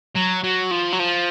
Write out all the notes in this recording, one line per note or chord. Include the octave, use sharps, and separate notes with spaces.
F#3
F#3
F3
F#3
F3